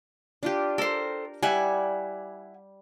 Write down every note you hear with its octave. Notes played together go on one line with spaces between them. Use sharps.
D4 F4 G4
A4 A#4 C5
G3 E4 F#5 G#5